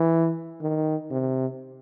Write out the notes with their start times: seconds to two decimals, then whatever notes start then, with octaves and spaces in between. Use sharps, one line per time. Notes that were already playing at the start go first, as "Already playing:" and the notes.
Already playing: E3
0.61 D#3
1.11 C3